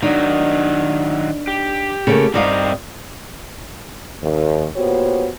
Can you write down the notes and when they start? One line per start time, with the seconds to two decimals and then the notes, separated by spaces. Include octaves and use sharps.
0.02 D#3 F#3 D4 D#4
1.48 G4
2.07 C#3 A3 A#3
2.34 G2 C4 D#4 G4 A#4 F5
4.22 D#2
4.76 A#2 B3 F#4 G4 C5 C#5